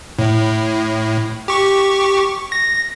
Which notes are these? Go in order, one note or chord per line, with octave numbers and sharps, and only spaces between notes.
A2
G4 C#6
A#6